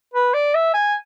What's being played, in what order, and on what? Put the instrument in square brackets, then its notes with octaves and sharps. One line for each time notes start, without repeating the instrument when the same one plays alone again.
[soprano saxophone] B4
D5
E5
G#5